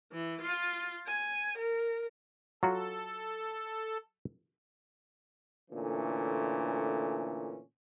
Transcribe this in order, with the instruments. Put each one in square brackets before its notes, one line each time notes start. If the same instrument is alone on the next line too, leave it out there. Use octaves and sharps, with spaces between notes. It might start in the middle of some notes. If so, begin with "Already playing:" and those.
[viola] E3
F4
G#5
A#4
[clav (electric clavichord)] F#3 F4 F#4 [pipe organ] A4
[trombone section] A#2 D3 E3 A3 C#4